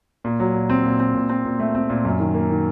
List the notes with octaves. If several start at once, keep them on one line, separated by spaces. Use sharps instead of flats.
A#2
F#3
A#2
C4
A#2
C4
A#2
C4
A#2
A3
C4
A#2
F#2
D#3
A#3
D#3